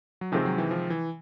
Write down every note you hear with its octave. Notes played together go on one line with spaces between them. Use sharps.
F#3
C3 D#3 F3 G#3 C4
F#3
E3
F3
E3